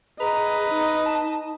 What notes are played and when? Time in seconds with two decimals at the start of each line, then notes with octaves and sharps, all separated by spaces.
0.20 G#4 B4 D#5 A#5
0.70 D#4
1.06 A5